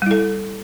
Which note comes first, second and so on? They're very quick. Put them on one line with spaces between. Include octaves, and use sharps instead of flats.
G3 E4 A4